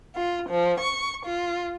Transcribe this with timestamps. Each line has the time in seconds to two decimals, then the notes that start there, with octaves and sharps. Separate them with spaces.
0.15 F4
0.50 F3
0.81 C#6
1.25 F4